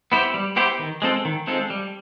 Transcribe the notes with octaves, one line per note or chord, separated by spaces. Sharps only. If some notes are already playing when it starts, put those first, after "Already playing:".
B3 E4 G4 C5
G3
B3 E4 G4 C5
D#3
G#3 C4 F4 A4
D#3
G#3 C4 F4 A4
G3